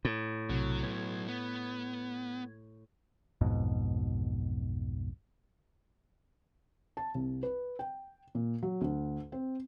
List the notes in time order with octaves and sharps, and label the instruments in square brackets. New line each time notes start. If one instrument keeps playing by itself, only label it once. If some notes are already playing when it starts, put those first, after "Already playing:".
[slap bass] A2
[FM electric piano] B1 C3 [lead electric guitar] F#3
[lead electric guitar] F#3 B3 [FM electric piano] G#6
[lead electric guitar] B3
[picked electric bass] B1 F2 G#2 B2
[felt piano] A5
C2
B4
G5
A#2
F#3
D2
C4